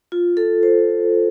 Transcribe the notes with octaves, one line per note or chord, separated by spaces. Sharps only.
F4
A4
C5